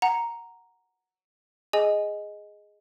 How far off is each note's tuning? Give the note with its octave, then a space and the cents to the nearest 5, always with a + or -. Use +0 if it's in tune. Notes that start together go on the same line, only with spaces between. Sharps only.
F#5 +0 A#5 +0
G#4 +0 D#5 +0 G#5 +0